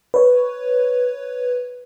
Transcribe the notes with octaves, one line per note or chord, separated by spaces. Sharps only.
B4 C#5